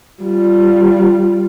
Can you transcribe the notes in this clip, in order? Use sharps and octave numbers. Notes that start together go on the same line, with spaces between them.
G3 F4